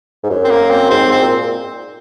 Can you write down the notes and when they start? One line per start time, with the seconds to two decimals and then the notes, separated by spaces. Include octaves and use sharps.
0.23 G#2
0.30 F#2
0.44 C4
0.50 A#3
0.70 C4
0.90 G#2 C4
1.06 G#2
1.11 C4
1.21 A#2